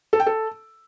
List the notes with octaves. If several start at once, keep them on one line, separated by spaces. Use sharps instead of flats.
A4
G5
A4